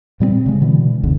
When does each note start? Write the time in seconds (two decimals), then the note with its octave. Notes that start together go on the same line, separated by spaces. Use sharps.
0.20 A#2 G3 A#3 C4
0.46 C#3 G#3
0.61 B2 D3 E3
1.03 F#1 C#2 B2 D3